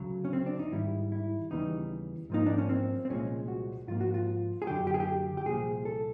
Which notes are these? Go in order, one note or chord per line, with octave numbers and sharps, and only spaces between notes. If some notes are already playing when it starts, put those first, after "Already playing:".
Already playing: D2 C#3 F#3
C#4
C4
D4
D#4
G#2 D#3 G3 E4
E4
D#2 C#3 E3 G3 B3 D#4
G#2 F3 A#3 D#4
D4
C#4
C4
C4
C2 A#2 F3 G#3 C#4
F#4
G#2 F3 A#3 F4
F#4
F4
G#4
F#2 D3 F#3 G4
G4
G#4
G4
G4
C2 A#2 F3 G#4
A4